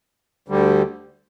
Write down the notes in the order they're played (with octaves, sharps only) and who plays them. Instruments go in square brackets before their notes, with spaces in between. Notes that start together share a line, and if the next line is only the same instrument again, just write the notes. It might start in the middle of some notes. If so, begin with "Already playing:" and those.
[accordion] D2 D3 G3